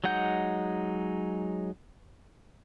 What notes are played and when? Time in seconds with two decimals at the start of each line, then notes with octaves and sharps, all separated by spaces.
0.04 F#3 G#3 D#4 F#5 G6